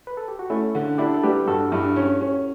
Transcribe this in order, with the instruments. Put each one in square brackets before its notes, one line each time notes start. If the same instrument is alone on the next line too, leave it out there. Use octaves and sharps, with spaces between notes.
[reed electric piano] B4
A4
G4
F#4
[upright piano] A3 [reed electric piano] C#4 E4
[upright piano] D3
[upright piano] D4 [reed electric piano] E4 G4
[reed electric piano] A4
[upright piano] G3 [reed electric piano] G4 B4
[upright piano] G2 [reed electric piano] F#4 A4
[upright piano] G2 [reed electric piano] E4 G4
[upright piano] C#4
C#4